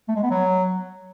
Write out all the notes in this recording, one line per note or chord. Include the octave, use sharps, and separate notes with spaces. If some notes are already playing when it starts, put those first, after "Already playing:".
A3
G#3
B3
F#3